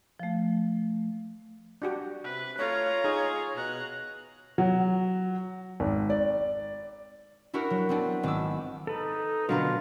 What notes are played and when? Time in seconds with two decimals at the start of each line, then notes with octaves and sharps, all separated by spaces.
0.20 F3 A3
1.82 D4 F#4 G4
2.24 C3 B4
2.58 A3 F4 C#5 A#5
3.04 D#4 G#4
3.56 B2 A#5 F#6
4.58 F#3
5.80 G#1
6.10 D5
7.54 D4 E4 F#4 G4 A#4
7.70 F#3
7.89 B3 C4 D4
8.23 G#1 D6 E6
8.87 D#4 A4 B4
9.49 B2 D3 F#3 D4 F4 A#4 B4